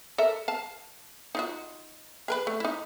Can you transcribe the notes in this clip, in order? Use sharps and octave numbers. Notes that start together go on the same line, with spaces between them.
A4 A#4 E5
F5 A5
D#4 F4 F#4
G#4 A#4 B4
A3
D#4 E4